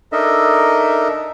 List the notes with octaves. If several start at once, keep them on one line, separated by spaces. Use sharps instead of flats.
D4 D#4 A4 A#4 D#5 E5